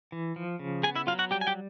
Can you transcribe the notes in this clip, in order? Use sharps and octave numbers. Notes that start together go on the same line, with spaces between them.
E3
F3
C#3
B3 G#4 G#5
E4 E5
F#3 F4 F5
F#4 F#5
G3 G4 G5
G#5
G4 G5